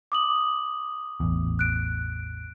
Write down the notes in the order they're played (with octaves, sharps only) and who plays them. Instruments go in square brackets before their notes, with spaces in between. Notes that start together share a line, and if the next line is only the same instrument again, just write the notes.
[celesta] D6 D#6 F#7
[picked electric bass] A1 E2
[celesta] F#6 D7